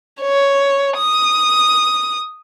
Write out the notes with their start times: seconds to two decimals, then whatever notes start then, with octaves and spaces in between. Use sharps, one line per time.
0.21 C#5
0.97 D#6